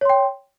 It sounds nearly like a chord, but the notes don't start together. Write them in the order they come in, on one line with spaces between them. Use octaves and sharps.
C#5 C6 G5